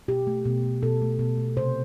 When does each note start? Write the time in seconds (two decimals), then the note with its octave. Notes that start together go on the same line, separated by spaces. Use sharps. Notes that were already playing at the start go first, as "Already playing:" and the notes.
0.08 B2 G4
0.27 A3
0.45 B2
0.63 A3
0.82 B2 A4
1.02 A3
1.19 B2
1.37 A3
1.57 C3 C5